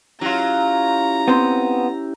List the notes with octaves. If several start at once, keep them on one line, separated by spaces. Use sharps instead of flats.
F#3 C#4 E4 F4 G4 A#5
B3 C4 C5